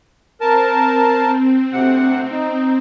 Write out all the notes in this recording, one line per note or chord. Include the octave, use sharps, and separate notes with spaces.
C4 A#4 A5
D2 C3 F#5
D#4